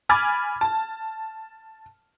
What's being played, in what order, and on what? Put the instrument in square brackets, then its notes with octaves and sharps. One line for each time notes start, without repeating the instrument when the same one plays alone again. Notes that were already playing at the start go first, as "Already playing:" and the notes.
[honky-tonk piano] G#5 B5 D6 F6 G#6 A6
A5